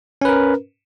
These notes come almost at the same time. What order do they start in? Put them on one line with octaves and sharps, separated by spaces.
C#4 B4 A#4